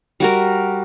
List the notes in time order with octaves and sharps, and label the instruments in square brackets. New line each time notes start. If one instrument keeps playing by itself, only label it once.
[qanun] G3 F#4 A#4